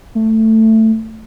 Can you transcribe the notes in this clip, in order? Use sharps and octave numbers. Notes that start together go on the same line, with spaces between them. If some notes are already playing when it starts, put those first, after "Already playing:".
A3